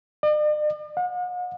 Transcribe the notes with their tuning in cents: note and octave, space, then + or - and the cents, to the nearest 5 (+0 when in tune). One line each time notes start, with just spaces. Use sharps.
D5 +45
F#5 -45